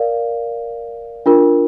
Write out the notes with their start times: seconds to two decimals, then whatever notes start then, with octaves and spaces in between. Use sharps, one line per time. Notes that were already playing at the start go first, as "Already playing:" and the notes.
Already playing: A#4 D5 F5
1.26 D4 F4 A#4